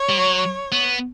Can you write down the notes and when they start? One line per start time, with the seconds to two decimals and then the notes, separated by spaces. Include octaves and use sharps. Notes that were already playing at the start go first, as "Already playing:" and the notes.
Already playing: C#5
0.09 G3
0.18 F#3
0.72 B3